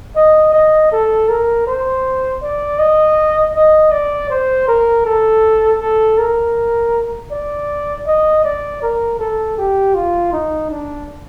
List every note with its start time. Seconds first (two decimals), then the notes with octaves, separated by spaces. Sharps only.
0.15 D#5
0.53 D#5
0.91 A4
1.28 A#4
1.67 C5
2.42 D5
2.79 D#5
3.55 D#5
3.92 D5
4.29 C5
4.68 A#4
5.06 A4
5.81 A4
6.18 A#4
7.31 D5
8.07 D#5
8.44 D5
8.82 A#4
9.19 A4
9.57 G4
9.95 F4
10.32 D#4
10.71 D4